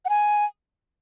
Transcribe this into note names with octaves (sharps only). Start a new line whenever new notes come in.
F#5
G#5